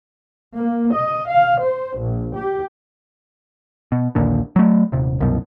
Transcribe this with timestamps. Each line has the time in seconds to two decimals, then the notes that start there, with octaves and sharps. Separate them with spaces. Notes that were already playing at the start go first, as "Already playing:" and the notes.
0.55 A#3
0.93 D#5
1.30 F5
1.62 C5
2.01 A#1
2.34 G4
3.92 B2
4.15 A#1 D#2 A#2 D3
4.56 F#3 A3
4.92 D#1 C3
5.20 C2 F#2 B2